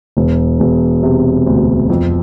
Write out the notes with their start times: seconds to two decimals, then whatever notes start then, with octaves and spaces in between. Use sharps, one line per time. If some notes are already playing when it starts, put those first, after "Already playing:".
0.17 E1
0.60 E1
1.03 C3
1.46 D2
1.90 F2